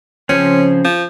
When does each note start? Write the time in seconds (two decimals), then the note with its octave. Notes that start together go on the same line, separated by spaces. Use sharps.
0.29 C#3 F3 C4 C#4
0.85 F3